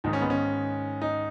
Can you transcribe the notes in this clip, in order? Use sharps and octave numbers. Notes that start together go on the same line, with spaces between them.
G#2 D#3 D#4
C#4
B3
C#4
D#4